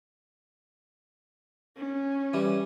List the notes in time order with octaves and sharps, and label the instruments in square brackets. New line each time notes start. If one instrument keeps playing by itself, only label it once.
[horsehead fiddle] C#4
[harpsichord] E3 G3